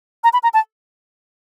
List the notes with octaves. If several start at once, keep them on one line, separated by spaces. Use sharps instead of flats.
A#5
B5
A#5
A5